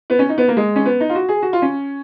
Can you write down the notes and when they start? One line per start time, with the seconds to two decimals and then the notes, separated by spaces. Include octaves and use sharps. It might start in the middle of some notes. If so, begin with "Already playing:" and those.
0.10 B3
0.19 C#4
0.29 D#4
0.38 B3
0.48 A#3
0.57 G#3
0.76 C#4
0.85 B3
1.00 D#4
1.10 F4
1.15 F#4
1.29 G#4
1.42 F#4
1.53 F4
1.62 C#4